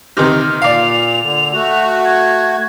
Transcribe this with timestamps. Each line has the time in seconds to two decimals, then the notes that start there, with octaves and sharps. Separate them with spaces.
0.17 C3 D#3 F6
0.62 A#2 D5 F5 F7
1.22 D3
1.53 A3 F#4
2.05 G#6